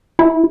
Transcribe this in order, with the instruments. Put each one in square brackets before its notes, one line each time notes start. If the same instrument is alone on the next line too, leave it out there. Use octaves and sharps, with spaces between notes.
[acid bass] E4